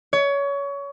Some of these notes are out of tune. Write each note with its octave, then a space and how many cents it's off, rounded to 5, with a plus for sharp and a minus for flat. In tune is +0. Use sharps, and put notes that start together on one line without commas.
C#5 +25